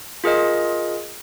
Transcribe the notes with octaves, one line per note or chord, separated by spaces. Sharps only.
F4 G#4 A#4 D#5